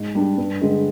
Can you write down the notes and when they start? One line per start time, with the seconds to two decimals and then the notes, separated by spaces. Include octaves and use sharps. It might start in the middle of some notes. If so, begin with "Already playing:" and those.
Already playing: G#2
0.15 G3 D4
0.38 G2
0.61 D3 G#3